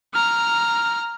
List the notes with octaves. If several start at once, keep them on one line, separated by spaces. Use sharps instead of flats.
A#5 F6